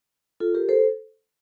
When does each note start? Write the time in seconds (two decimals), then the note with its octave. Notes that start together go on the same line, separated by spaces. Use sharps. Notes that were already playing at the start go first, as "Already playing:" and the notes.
0.40 F4 A4
0.54 G4 A#4
0.69 A4 C5